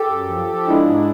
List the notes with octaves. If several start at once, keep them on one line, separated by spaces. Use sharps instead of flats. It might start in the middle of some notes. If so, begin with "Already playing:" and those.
Already playing: G4 A4
F#2
F3
F3
G#3 D4 E4
G#2